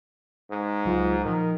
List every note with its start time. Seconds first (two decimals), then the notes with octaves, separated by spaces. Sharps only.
0.51 G#2
0.85 C#2 F#3 F4
1.25 A#2 D#3 F3